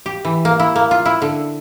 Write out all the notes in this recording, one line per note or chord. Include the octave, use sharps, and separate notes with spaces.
G4
E3
A#3
E4
A#3
F4
E4
D3